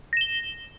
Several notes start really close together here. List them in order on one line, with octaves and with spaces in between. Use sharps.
A#6 E7 G7